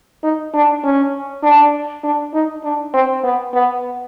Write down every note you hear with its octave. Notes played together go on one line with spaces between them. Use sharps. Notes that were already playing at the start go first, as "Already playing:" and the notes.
D#4
D4
C#4
D4
D4
D#4
D4
C4
B3
B3